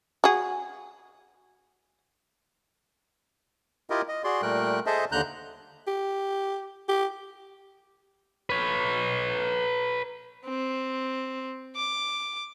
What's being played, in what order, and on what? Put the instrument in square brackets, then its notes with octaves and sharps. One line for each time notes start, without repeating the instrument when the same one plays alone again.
[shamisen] F#4 G#4
[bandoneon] E4 F4 G4 A#4 D#5
D#5
F#4 G#4 D5 C6
A#2 G3 A3 A#4 G5 F#6
G#4 A4 C5 D#5 E5 A5
D#2 D3 A#5 F#6 G6
[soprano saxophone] G4
G4
[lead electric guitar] B4 C#5
[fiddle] C4
D6